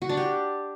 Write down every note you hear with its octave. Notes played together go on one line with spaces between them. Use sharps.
F#4
D4
G4